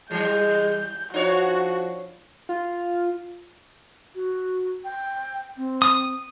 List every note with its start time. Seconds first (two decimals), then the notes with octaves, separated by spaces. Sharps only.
0.11 E3 G3 G#3 G6
1.14 F3 D4 F#4 C#5
2.49 F4
4.15 F#4
4.85 G5
5.57 C4
5.82 D#6